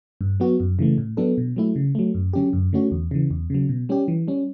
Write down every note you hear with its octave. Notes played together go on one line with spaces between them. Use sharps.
G2
F#3 B3 F#4
F#2
C#3 E3 A3
A2
F#3 B3 D4 A4
B2
F#3 A3 E4
C#3
F#3 A3
F#2
D3 F#3 C#4 G4
F#2
D3 A3 C#4 F#4
E2
C#3 E3
E2
C#3 F#3
B2
G3 C#4 G4
E3
G3 C#4